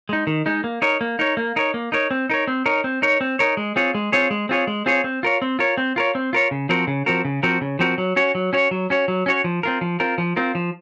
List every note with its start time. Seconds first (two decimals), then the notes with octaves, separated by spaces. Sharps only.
0.09 G#3 D#4
0.27 D#3
0.46 G#3 D#4
0.64 A#3
0.82 D#4 A#4 C#5
1.01 A#3
1.19 D#4 A#4 C#5
1.37 A#3
1.56 D#4 A#4 C#5
1.74 A#3
1.92 D#4 A#4 C#5
2.11 C4
2.30 D#4 A#4 C#5
2.47 C4
2.66 D#4 A#4 C#5
2.84 C4
3.02 D#4 A#4 C#5
3.21 C4
3.39 D#4 A#4 C#5
3.57 G#3
3.76 C4 F4 G#4 C#5
3.95 G#3
4.12 C4 F4 G#4 C#5
4.31 G#3
4.49 C4 F4 G#4 C#5
4.67 G#3
4.86 C4 F4 G#4 C#5
5.04 C4
5.23 F4 A#4 C#5
5.42 C4
5.59 F4 A#4 C#5
5.77 C4
5.96 F4 A#4 C#5
6.15 C4
6.33 F4 A#4 C#5
6.51 C#3
6.69 F3 C4 F#4 A#4
6.87 C#3
7.06 F3 C4 F#4 A#4
7.25 C#3
7.43 F3 C4 F#4 A#4
7.61 C#3
7.79 F3 C4 F#4 A#4
7.98 F#3
8.16 C#4 F#4 C#5
8.35 F#3
8.53 C#4 F#4 C#5
8.71 F#3
8.90 C#4 F#4 C#5
9.08 F#3
9.26 C#4 F#4 C#5
9.44 F3
9.63 C4 F4 A#4
9.81 F3
10.00 C4 F4 A#4
10.18 F3
10.36 C4 F4 A#4
10.55 F3